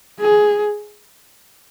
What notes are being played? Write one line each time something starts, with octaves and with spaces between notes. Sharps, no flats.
G#4